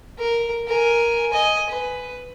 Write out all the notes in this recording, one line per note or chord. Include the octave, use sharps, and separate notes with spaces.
A#4
A#4 G#5
D#5 G#5
B4